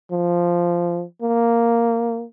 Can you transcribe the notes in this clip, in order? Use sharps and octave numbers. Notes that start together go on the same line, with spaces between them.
F3
A#3